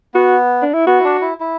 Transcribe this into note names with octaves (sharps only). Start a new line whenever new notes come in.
B3 F#4
D4
E4
B3 F#4
E4
D4
E4
E4